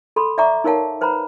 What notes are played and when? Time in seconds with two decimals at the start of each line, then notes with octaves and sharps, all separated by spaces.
0.16 A4 B5 C6
0.38 D5 E5 F#5 A#5 C#6 D6
0.64 D#4 A#4 C#5 F5 F#5 A5
1.01 B4 C5 F#5 A#5 B5